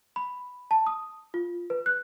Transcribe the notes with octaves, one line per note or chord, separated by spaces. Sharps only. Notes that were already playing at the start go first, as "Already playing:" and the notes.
B5
A5
D#6
F4
B4
F#6